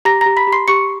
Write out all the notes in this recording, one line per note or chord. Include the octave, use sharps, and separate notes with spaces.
G4 A#5 A#6
G4 A#5 A#6
B5 B6
G4
C6 C7
G4 C#6 C#7